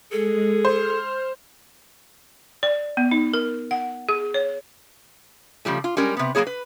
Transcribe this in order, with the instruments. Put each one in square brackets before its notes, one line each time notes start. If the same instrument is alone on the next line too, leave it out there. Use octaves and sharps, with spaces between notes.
[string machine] G#3 [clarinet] G#4 [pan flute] A4
[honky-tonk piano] C5 [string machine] F6
[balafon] D5
B3
D#4
A#4
F#5
G#4
C#5
[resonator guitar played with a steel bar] C#3 F3 G3 A3
F4
G3 G#3 C#4 A#4
C3 B3
F#3 G#3 A#3 G#4 C#5
B4